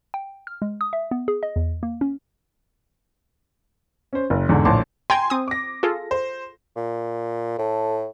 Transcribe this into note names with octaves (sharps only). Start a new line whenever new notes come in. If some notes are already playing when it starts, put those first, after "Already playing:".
G5
F6
G#3
D#6
E5
B3
G#4
D#5
E2
A#3
C#4
C#4 C5
F#1
E2 G#2 D3
A#1 A2 A5 C6 D6
G5 G#5 A#5 C6 G#6
C4 D#6
D6 A#6
F4 G#4 A4
C5
A#2
A2 A4